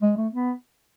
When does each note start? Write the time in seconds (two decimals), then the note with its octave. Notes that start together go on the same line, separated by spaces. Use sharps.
0.02 G#3
0.17 A3
0.32 B3